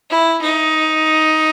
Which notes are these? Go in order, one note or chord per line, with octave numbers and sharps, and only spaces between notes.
E4
D#4